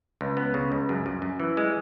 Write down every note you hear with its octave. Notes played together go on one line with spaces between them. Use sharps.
C#2
B3
C#3
C#2
F#2
F#2
F#2
E3
G#3